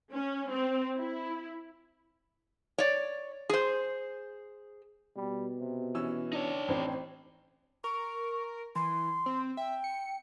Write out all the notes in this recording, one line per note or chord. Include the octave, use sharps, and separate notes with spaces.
C#4
C4
E4
C#5 D5
G#4 C5
B2 G3
C3
E3 C#4 E6
D4 D#4 C#5
A1 C4
A#4 C#6
E3 C6
C4
E5 G5
C#7